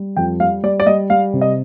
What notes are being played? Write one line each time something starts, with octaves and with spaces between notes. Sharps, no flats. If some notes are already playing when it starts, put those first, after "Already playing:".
Already playing: G3
F2 G5
G3 F5
G3 D5
D5
G3 D#5
G3 F5
C3
D#5